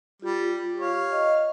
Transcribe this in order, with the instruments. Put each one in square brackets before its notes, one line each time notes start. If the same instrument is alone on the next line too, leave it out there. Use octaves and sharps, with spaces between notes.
[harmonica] G3 [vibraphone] F4 G4
[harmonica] C#5 F5
[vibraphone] D#5